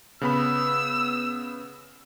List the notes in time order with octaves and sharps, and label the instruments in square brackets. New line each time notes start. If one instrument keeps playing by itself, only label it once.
[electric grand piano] C#3 B3 B5 [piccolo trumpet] E6